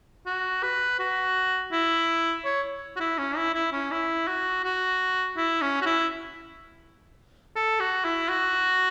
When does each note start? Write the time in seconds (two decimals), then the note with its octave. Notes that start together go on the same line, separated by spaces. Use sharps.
0.26 F#4
0.63 B4
0.99 F#4
1.72 E4
2.45 C#5
2.96 F#4
3.00 E4
3.18 C#4
3.37 E4
3.54 E4
3.73 C#4
3.91 E4
4.27 F#4
4.64 F#4
5.37 E4
5.62 C#4
5.81 F#4
5.86 E4
7.56 A4
7.80 F#4
8.05 E4
8.29 F#4